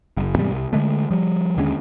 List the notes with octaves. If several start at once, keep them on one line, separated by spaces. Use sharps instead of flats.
F#1
E2 G#2 C3 G3
C2
D3 G#3 A3
F3 G3
D#2 D3 G#3 C#4